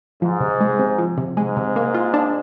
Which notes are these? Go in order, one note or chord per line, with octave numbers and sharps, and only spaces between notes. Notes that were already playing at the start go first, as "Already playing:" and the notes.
G#2 F3
C3
G#3
C3
F3
C3
G#2 G#3
C3
A#3
F4
D4